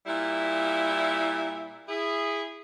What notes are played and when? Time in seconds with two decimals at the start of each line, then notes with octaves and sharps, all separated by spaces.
0.07 A#2 G3 E4
1.89 E4 G#4